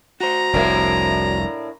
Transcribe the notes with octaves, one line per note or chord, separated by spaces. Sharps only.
F#4 C5 A#5
F1 C2 A2 A#3 D4